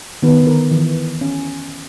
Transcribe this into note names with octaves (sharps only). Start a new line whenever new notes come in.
D#3 B3 B4
D3 D#3 A#4
D#3 E3
C#4